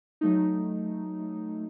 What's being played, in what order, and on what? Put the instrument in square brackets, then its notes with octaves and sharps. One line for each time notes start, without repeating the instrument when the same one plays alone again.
[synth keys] F#3 A3 D#4